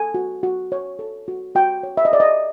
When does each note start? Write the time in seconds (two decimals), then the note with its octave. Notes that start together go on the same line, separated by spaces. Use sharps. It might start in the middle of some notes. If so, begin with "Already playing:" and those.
Already playing: A4 G#5
0.14 F#4
0.43 F#4
0.72 C#5
0.99 A4
1.28 F#4
1.55 F#4 G5
1.83 C#5
1.97 E5
2.05 D#5
2.12 A4 D5
2.20 D#5